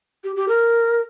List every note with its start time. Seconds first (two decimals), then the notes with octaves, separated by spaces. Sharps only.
0.24 G4
0.36 G4
0.48 A#4